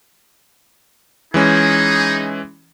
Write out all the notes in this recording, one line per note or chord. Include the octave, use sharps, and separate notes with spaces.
E3 G#3 C#4 D#4 G#4